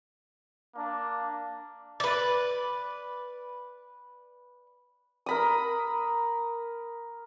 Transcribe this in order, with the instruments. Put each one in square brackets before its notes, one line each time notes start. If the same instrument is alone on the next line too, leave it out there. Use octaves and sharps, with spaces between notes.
[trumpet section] A#3 D4
[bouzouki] B4 D5
[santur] A#4 B5 D#6